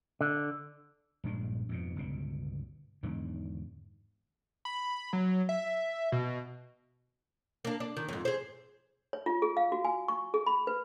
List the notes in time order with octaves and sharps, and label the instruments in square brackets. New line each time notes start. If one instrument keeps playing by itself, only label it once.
[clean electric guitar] D3
[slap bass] A#1 G2 A#2 G#3
F2 G#2 B2
G1 C#2 B2
E2 G#2 D3 D#3
[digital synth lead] B5
F#3
E5
B2
[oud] A#3 D4
D4
D#3
F2 G#2
G#4 C5
[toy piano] C#5
F4
G#4
F5
F#4
G#5
C#6
G#4
B5
B4